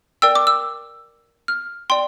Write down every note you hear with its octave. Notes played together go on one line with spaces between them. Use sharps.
A#4 D5 G5 E6
D6
E6
F6
D5 G5 C6